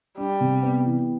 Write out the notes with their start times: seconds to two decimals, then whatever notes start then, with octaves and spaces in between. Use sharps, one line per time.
0.18 G3 D4
0.40 C3
0.63 B3
0.85 E3